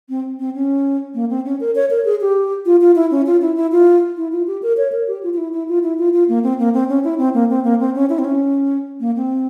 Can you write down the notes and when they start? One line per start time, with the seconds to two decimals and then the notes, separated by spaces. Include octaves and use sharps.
0.09 C4
0.39 C4
0.55 C#4
1.15 A#3
1.30 C4
1.45 C#4
1.60 A#4
1.75 C#5
1.90 A#4
2.05 G#4
2.21 G4
2.66 F4
2.81 F4
2.96 E4
3.11 C#4
3.26 F4
3.41 E4
3.56 E4
3.72 F4
4.17 E4
4.32 F4
4.47 G4
4.62 A#4
4.77 C#5
4.92 A#4
5.08 G4
5.23 F4
5.33 F4
5.38 E4
5.53 E4
5.68 F4
5.83 E4
5.98 F4
6.13 F4
6.29 A#3
6.43 C4
6.59 A#3
6.74 C4
6.89 C#4
7.04 E4
7.19 C4
7.34 A#3
7.50 C4
7.64 A#3
7.80 C4
7.95 C#4
8.09 E4
8.19 C4
8.24 C#4
9.00 A#3
9.16 C4